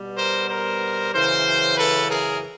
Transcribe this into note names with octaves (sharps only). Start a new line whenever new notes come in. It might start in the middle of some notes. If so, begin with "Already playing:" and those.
Already playing: B2 G3 B3
A#4 C5
A#4 C5
F#2 C#3 E3 A#4 C5
A4 B4
G#4 A#4